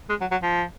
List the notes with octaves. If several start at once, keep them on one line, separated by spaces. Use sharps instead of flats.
G#3
F#3
F#3
F3